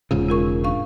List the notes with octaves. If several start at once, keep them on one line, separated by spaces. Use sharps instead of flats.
E1 G#2 C#3 F4
F4 A#4 C#6
D4 F5 C#6